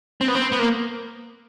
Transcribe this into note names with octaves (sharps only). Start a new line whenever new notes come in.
C4
B3
C4
B3
A#3